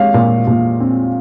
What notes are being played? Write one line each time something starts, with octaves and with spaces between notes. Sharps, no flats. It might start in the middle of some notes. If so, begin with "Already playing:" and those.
Already playing: G#3 C4 C#5 F5
A#2
A#2
C4